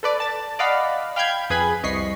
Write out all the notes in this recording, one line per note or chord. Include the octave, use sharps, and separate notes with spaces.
A4 B4 D5
A5 A6
D5 D#5 F5 F#5 B5
F5 G5 B5 F6 G6 G#6
F2 G#4 B4 B5 G#6
C2 D#5 C#6 B6 C7